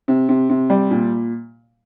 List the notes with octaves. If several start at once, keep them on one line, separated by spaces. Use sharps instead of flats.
C3
C3
C3
G3
A#2